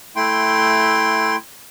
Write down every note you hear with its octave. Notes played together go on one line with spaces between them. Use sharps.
A3 E4 G5 C6